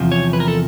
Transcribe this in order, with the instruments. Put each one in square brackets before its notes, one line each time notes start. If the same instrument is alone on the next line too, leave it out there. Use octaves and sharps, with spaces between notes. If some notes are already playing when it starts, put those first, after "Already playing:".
Already playing: [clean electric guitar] E2 C3 F3
C#5
B4
A#4
A4